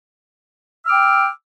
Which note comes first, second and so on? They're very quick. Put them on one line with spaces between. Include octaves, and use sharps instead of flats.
E6 F6 D6 G5